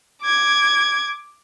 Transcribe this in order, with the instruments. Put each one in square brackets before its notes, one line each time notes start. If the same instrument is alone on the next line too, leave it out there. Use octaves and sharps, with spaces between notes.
[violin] D6 G#6